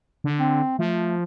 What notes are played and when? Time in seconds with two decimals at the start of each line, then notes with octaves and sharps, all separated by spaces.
0.24 D3
0.40 C4
0.79 F3 A3